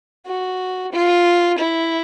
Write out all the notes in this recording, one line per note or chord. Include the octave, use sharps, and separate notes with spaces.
F#4
F4
E4